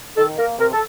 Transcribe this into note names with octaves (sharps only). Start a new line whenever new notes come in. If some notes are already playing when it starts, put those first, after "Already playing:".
D#3 A4
A#3 A#4
C3 A#4
A4